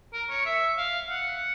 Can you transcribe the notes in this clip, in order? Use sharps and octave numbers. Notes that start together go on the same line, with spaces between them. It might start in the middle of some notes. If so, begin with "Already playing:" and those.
A#4
C#5
E5
F5
F#5